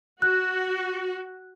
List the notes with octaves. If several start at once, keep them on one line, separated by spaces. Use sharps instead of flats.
F#4 F#6